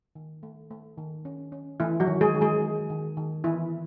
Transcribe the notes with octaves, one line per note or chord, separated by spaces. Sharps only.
D#3
A3
A3
D#3
C#4
C#4
E3 A3 E4
F#3 F#4
D#3
G#3 G#4
D#3
G#3 G#4
D#3
D#3
D#3
E3 B3 E4